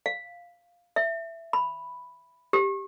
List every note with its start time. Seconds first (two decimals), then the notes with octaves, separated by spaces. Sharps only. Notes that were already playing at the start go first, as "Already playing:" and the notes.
0.06 F5
0.96 E5
1.53 B5
2.53 G4